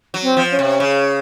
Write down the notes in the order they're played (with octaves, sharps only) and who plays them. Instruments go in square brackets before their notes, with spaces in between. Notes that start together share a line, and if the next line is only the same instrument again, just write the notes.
[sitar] F#3
[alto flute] C4
[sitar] F3
[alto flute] C#4
[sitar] C3
C#3